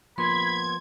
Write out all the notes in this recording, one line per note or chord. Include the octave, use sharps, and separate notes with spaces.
F3 A#3 B3 B5 C6 G#6